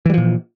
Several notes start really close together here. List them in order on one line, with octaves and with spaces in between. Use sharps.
E3 G3 F3 A#2